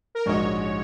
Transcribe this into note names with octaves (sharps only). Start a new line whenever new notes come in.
A#4
A#1 G#2 G#3 F#4 C#5 D#5